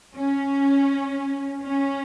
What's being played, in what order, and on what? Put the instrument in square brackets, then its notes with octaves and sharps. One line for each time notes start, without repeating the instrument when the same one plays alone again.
[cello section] C#4
C#4